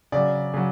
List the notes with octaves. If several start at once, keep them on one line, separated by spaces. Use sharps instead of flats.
C#3 F#3 D5
C#3 F#3